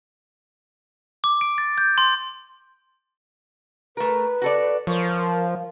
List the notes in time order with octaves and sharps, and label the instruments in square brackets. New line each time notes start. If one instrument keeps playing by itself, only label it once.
[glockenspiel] D6
D7
A6
G6
C6
[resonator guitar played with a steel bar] A3 A#4 [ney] B4
[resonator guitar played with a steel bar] F#4 A4 D5
[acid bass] F3 [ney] A#4 [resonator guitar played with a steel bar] C#5